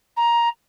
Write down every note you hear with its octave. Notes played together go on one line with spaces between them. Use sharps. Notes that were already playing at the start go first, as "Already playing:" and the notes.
A#5